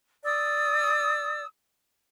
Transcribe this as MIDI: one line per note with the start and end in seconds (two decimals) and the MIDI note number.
0.25 1.45 74
0.25 1.45 87
0.25 1.45 88